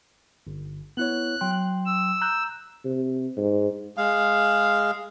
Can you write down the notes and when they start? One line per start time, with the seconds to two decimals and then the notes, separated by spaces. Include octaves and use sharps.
0.47 G1
0.97 B3 E4 C#5 F#6
1.41 F#3 G5 C6
1.86 E6
2.21 A#5 F#6 G6
2.85 C3
3.37 G#2
3.97 G#3 F5